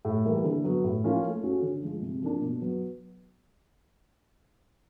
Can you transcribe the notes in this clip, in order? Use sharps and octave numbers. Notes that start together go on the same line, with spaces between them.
A2
E3 G3 A#3
D3
F#3 B3
A2
F3 A#3 C#4 F4
A3
C#4 F#4 A4
D3
F3 G#3
C3
F3 A#3 D4
B2
F#3 B3